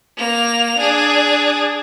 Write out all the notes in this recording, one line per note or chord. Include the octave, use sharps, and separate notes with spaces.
A#3 F7
D4 G#4